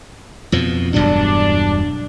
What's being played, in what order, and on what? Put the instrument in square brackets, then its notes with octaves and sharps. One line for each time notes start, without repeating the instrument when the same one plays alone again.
[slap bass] F2 B2 F3
[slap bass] E1 G2 F#3 [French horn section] D4